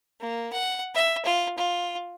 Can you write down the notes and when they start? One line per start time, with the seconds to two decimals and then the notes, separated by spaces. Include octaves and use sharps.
0.20 A#3
0.53 F#5
0.95 E5
1.25 F4
1.58 F4